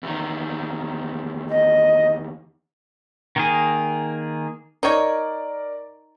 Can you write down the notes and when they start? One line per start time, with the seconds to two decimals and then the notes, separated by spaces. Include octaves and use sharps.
0.03 E2 D#3
1.49 D#5
3.36 D#3 A#3 G#4
4.83 D#4 A#4 C#5 D5